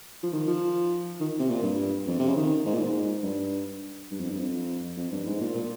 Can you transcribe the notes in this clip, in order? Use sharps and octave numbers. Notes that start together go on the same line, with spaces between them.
F3
D#3
F3
D#3
C3
A#2
G2
F2
C3
C#3
D#3
G#2
A#2
G#2
G2
G2
F2
G2
F2
F2
G2
G#2
A#2
A#2